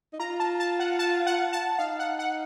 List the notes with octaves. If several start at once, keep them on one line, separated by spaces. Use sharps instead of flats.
D#4
F4 A#5
A5
A5
F#5
A5
F#5
A5
D#4 F5
F#5
F#5